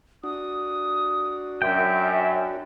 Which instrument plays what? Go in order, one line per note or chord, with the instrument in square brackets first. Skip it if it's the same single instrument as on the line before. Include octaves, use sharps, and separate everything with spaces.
[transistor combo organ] D4 F#4 [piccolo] D#6
[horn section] F#2 [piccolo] E5 [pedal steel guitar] G5